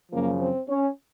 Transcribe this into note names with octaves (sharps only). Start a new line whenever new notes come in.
F#2 C#3 F3 A#3
C4
C#4